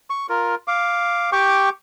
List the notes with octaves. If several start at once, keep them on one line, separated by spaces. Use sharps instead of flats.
C#6
F4 A#4
F5 D6
G4 G5 C#6 D6